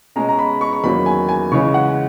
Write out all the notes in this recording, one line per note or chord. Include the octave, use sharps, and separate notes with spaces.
B2 G#3 C#4 A#5
A#5
B5
C#6
C#6
E2 D#3 F#3 A#3 C#4 B5
G#5
G#5
C#3 E3 G#3 C#4 C#6
F#5